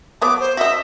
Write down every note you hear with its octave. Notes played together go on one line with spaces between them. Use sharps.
F#3 B3 C#5 D6
C5
F#4 D#5 E5